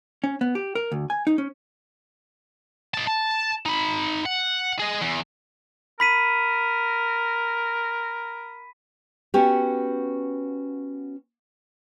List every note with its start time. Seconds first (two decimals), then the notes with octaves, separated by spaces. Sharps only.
0.24 C#4
0.41 B3
0.55 G4
0.75 A#4
0.92 D2
1.10 G#5
1.27 D#4
1.38 C#4
2.94 D#4 A5
3.07 A5
3.66 D#4 B5
4.26 F#5
4.80 G#4 D#5
5.02 E2
6.00 A#4 B5 B6 D#7
9.34 B3 C#4 F#4 G4